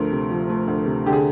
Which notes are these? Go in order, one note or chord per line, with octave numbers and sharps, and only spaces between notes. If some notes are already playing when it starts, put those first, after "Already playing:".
Already playing: D2 F3 A3 A#4
C3
F3
A3
D2
C3
D3 G4
G#4